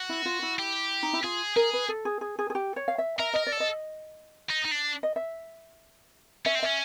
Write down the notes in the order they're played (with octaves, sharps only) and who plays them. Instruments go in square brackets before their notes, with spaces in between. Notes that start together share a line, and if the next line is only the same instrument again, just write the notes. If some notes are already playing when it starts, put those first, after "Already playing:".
Already playing: [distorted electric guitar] F#4
[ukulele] E4
F4
E4
[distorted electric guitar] G4
[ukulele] D#4
E4
[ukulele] F4 [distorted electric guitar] G#4
[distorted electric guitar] G#4 [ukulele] A#4
[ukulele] B4
A4
G#4
G#4
G#4
G#4
G4
C#5
F5
E5
[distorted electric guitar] A#4 [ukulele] E5
[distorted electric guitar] A#4 [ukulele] D#5
[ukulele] D5
[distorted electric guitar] A4
[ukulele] D#5
[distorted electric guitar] D#4
D#4
D4
[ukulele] D#5
E5
[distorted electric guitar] C#4 [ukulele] E5
[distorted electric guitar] C4
[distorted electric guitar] C#4 [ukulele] E5